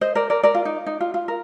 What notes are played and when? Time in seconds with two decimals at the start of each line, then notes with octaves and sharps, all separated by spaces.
0.01 C5 D#5
0.15 A#4 D5
0.30 A#4 D5
0.43 A#4 D5
0.55 F4
0.65 D#4
0.86 D#4
1.01 F4
1.14 F4
1.28 A#4